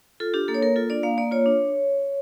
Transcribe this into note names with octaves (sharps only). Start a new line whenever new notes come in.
F4 A4
D4 G4
A#3 A4
C#5
A#3 A#4
F4 A4
D4 D5
A#3 F5
A#3 D5
F4 C#5
D4